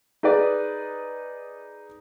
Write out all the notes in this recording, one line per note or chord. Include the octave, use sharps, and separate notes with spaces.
D#4 G#4 B4 D5